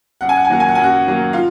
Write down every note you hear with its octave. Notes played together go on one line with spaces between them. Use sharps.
F#2 F#5
G#5
F#5
G#5
D#3 F#3 A#3 F#5
G#5
F#5
F#2 G#5
F#4 F#5
D#3 F#3 A#3
F4 F5